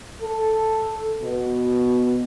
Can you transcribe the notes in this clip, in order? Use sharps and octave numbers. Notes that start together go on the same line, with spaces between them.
A4
B2